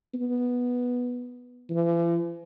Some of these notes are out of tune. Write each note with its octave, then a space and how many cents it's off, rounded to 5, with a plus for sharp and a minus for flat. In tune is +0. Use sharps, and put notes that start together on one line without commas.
B3 -5
E3 +45